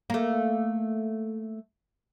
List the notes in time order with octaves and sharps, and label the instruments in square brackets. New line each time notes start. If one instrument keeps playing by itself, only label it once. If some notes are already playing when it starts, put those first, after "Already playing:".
[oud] A3 A#3